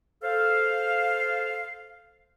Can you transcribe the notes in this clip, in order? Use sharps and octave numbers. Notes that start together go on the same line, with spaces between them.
A4 C5 F5